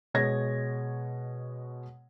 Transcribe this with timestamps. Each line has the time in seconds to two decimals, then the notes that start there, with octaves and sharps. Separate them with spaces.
0.14 B2 G#3 C#5 G#6 A#6